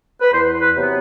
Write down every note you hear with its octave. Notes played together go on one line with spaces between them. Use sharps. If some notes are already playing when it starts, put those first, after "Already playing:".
B4
E2 C5
B4
C3 F#3 B3